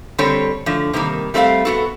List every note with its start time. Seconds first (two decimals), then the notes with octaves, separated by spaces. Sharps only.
0.18 D3 G3 C4 A4 C#5
0.66 A2 D3 F3
0.93 C3 D#3 G3 A#3
1.34 G3 A3 C4 C5 F5
1.65 B3 F#4 A4